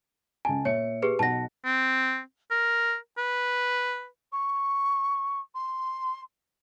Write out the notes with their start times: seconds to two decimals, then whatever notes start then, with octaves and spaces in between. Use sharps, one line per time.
0.45 C#2 G#5 A5
0.65 A#2 C#5 E5 C#7
1.02 G4 G#4 B4
1.19 B1 B2 F#5 A5 A#6
1.65 C4
2.51 A#4
3.18 B4
4.32 C#6
5.54 C6